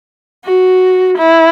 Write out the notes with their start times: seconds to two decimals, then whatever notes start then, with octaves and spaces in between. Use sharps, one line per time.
0.45 F#4
1.18 E4